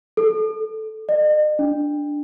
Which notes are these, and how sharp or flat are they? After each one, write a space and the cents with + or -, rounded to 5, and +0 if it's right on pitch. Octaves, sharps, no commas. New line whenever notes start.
A4 -10
D#5 -45
D4 +0